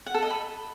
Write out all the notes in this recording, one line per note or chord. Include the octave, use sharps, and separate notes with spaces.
F#5
A4
D#5
B5